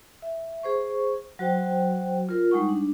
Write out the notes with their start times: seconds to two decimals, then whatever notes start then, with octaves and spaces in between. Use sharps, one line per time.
0.22 E5
0.63 G#4 C5 C#6
1.39 F#3 F#4 C5 G5
2.29 F4 A#4
2.51 G3 G#3 D#4 F#5 C#6
2.69 D4